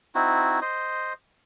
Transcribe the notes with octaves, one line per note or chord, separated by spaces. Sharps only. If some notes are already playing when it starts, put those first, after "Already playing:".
C4 D#4 E4 F#4
C5 D#5